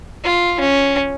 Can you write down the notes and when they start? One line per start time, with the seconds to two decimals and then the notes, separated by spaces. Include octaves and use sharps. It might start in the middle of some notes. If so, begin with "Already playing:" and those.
0.24 F4
0.60 C#4